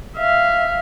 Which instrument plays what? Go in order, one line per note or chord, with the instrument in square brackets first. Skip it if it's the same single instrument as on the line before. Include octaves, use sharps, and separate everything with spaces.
[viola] E5 F5